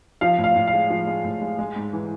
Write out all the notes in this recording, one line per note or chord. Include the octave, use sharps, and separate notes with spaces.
F3 F5
A2
F5
A2
F5
G#3
F3
G#3
A2
G#3
G#3
G#2
E3